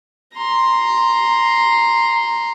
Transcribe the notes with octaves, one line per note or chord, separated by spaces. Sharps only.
A#5 C6